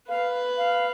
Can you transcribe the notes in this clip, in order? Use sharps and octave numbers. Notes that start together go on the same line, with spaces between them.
B4 F5
F5